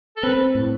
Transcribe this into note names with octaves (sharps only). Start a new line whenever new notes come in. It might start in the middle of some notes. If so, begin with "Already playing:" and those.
A4
C4 B4
A2